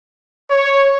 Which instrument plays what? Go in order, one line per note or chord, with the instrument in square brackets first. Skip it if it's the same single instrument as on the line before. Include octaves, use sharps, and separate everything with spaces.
[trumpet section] C#5